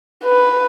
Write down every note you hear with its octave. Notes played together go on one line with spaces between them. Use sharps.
B4